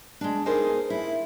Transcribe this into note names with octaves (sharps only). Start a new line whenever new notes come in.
G#3 D4
G#3 B3 D#4 G#4 A#4 C5
E4